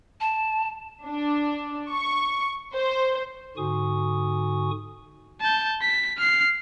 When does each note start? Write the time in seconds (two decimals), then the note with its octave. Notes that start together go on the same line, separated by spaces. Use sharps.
0.21 A5
1.05 D4
1.90 C#6
2.74 C5
3.57 G#2 D3 F#4 G#5 C#6 D#6
5.41 A5 G6
5.81 B6
6.18 F6 C7